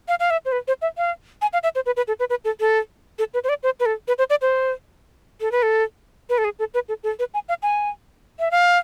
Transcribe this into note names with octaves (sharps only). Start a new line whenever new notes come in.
F5
F5
E5
C5
B4
C5
E5
F5
G#5
F5
E5
C5
B4
B4
A4
B4
B4
A4
A4
A4
B4
C5
D5
C5
B4
A4
B4
C5
D5
C5
A4
B4
A4
B4
A4
G#4
A4
B4
A4
A4
B4
G#5
F5
G#5
E5
F5